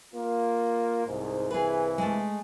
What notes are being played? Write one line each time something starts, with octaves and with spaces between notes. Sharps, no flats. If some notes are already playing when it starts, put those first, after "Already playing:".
A#3 F4
C2 G#2
C2 G2 E3 G#4 B4
G#3 A3